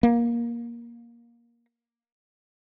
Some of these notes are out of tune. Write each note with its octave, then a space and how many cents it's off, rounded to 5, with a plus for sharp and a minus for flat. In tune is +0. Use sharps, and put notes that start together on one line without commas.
A#3 +15